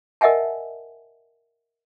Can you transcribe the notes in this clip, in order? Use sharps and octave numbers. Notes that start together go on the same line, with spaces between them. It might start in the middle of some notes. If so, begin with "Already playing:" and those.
A#4 D#5 E5 F#5 G#5 A5